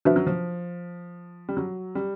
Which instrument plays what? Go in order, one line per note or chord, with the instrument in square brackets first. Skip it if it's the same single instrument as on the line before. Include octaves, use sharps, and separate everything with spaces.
[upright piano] F3 [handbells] D4 F#4 B4 E5
[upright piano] F#3
F3
G3
F#3
G3